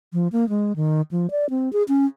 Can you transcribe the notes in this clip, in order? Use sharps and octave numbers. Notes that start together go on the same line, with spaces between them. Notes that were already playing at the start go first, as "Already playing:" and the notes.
F3
A#3
G#3
D#3
F3
D5
C4
G#4
C#4